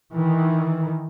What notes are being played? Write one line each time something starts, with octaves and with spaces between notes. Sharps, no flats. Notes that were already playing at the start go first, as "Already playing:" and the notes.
D#3 E3